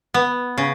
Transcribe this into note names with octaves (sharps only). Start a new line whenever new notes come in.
B3
C#3